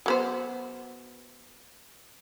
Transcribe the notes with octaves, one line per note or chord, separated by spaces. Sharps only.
F#3 B3 C5